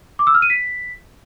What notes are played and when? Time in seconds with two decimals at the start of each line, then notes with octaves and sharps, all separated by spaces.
0.19 D6
0.27 E6
0.35 F6
0.42 D#7
0.50 B6